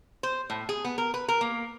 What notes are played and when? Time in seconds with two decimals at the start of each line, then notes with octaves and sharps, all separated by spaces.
0.23 C5
0.50 A2
0.69 G#4
0.84 B3
0.98 A#4
1.14 B4
1.28 A#4
1.41 A#3